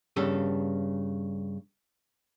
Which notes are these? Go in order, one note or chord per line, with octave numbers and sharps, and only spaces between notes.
G2 C#3 A4